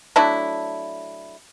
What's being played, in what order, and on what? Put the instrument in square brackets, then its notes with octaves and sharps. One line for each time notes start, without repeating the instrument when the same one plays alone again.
[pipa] F#3 A3 D4 E4